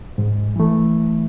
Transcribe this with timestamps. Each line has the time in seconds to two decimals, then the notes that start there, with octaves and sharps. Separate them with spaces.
0.18 G#2
0.56 E3 A3